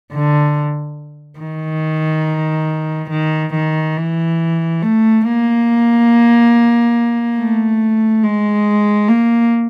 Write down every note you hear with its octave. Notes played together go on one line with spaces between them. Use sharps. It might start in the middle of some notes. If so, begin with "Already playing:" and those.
D3
D#3
D#3
D#3
E3
A3
A#3
A3
G#3
A#3